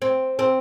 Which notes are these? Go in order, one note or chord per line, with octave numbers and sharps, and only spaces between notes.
C4
C4